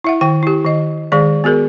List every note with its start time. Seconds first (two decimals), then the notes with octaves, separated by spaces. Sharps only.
0.04 E4 E5 F#5
0.21 D#3 G5
0.43 E4 G4
0.64 D#3 D#5
1.12 D#3 G#3 G#4 D5
1.44 B3 F#4 G#4 A#4